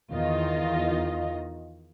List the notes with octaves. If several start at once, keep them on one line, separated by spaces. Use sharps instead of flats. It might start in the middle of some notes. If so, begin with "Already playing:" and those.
E2 D#3 F4 D#5